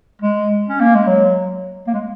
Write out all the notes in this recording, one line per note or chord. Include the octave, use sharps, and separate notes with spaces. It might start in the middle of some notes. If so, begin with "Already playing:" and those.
G#3
C#4
A#3
G#3
F#3
A#3
G#3